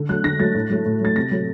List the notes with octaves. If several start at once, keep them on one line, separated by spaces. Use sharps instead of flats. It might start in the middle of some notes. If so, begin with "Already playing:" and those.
Already playing: D3
F#3 A3 F#6
D3 A#6
F#3 A3 A6
A2
F#3 A3
A2
F#3 A3 A6
C3 A#6
F#3 A3